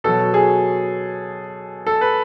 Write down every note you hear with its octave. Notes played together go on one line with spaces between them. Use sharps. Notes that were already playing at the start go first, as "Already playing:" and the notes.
B2 F#3 A4
G#4
A4
B4